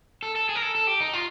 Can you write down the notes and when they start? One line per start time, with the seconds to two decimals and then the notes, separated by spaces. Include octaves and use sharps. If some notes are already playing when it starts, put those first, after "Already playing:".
0.23 A4
0.36 A4
0.49 G#4
0.55 A#4
0.62 A4
0.75 A4
0.87 G4
1.00 D#4
1.13 F4